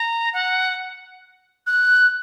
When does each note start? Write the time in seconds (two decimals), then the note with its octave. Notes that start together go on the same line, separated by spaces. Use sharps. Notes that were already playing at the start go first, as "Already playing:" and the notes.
Already playing: A#5
0.33 F#5
1.67 F#6